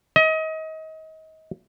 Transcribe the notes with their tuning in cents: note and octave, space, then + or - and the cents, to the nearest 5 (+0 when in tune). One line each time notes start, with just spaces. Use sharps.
D#5 +30